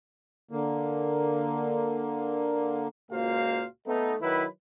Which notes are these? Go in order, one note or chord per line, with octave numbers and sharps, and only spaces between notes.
D3 A#3
C#2 A#2 A#3 F#4 C5 F5
A3 B3 D#4
D#3 F#3 E4 B4